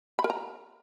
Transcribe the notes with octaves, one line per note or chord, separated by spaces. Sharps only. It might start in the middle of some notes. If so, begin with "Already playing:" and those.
B5
A#4
A#5